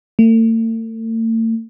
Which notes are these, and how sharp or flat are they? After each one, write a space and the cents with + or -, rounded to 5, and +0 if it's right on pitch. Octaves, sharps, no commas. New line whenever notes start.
A3 +45